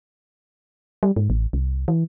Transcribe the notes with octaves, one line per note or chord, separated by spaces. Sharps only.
G3
G#2
A1
C2
E3